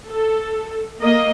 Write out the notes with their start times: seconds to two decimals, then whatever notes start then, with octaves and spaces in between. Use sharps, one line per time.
0.10 A4
1.00 A#3 D#5